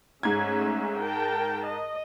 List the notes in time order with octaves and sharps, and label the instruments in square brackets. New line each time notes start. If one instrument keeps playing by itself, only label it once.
[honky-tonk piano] G#2 G#6 [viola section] A3 C#4 E5
[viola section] A#4 G5 A5
D#5